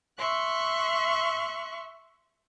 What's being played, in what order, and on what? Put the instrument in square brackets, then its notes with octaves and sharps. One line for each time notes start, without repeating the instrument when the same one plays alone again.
[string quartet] E5 C6 C#6 F#6